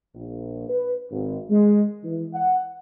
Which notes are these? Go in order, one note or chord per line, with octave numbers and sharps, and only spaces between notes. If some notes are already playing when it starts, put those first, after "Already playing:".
A#1
B4
G#1
G#3
E3
F#5